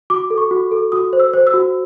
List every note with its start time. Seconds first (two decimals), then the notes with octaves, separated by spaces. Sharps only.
0.10 F#4 D6
0.30 A4
0.38 C#6
0.51 F#4
0.71 A4
0.92 F#4 D#6
1.13 C5
1.20 E6
1.33 C5
1.47 E6
1.54 F#4